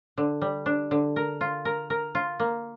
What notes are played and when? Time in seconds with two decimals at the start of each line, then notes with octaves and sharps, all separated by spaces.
0.18 D3
0.42 G3
0.66 D4
0.91 D3
1.16 A#4
1.41 F4
1.65 A#4
1.90 A#4
2.15 F4
2.39 A#3